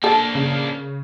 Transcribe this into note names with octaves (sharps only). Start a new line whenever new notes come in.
A#3 D4 A4
C#3